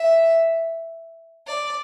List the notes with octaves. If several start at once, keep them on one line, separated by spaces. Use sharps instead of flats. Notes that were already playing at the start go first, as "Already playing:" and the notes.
Already playing: E5
D5